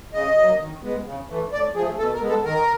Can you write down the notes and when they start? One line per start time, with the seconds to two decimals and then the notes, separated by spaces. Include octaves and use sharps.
0.14 C#3 D#5
0.37 F#3 A#3
0.60 D#3
0.83 G#3 B3
1.06 C#3
1.29 E3 A3
1.52 A2 D5
1.75 F3 G#4
1.80 A3
1.98 B2 A4
2.14 A#4
2.21 G#3 B3
2.29 A4
2.44 D#3 A#4